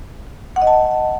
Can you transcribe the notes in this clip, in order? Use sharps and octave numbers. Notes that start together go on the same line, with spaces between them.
F#5
D#5
A5